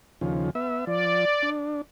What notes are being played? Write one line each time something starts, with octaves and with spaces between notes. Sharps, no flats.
D#2 C#3 F3
B3 E5
F3 D5
D4